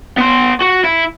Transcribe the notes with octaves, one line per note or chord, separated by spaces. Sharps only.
B3 C6
F#4
E4